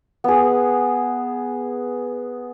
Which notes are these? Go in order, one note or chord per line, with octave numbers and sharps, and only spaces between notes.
B3 G#4